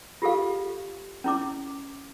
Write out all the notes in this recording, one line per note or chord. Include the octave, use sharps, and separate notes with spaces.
F4 G4 A4 F5
C#4 E4 D6